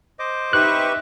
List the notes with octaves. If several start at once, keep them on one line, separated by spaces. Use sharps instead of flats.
C5 D#5 D6
D#4 G4 B4 E5 C#6 F#6